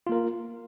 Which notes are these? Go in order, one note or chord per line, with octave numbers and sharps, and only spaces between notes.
A#3 F4 A#4